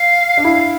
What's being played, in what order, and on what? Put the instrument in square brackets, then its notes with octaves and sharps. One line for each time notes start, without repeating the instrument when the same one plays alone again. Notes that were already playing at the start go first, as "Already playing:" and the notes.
Already playing: [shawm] F5
[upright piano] D4
[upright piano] E4 [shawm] F5